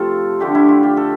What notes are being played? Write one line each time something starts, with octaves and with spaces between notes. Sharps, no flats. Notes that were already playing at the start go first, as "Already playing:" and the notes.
Already playing: C3 F3 A3 F4 A4
D3 A3 D4 G4
E4
F4
G4
A4